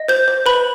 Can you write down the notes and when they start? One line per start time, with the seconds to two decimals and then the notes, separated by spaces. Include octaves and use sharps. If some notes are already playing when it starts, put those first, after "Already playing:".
Already playing: D#5
0.08 C5 G6
0.28 C5
0.46 B4 B5